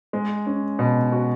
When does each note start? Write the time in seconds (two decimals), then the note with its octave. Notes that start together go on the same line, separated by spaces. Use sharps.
0.13 G#3
0.46 C#4
0.79 B2
1.12 F#4